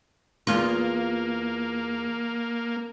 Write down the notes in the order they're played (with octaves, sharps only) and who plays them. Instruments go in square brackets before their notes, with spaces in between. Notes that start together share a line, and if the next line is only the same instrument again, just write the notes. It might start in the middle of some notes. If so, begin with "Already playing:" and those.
[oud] E2 F4 [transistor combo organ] A#3